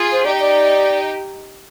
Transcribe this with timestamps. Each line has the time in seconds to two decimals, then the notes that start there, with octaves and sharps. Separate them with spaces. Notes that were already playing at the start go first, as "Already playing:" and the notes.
Already playing: F4 G#4
0.12 C5
0.25 D#4 G4 D5
0.40 D5